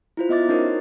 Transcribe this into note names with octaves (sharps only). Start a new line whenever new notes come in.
E4 F4 C5
B3 D#5 E5 D6 A6
C#4 D#4 F#4 A#4 C5 C#5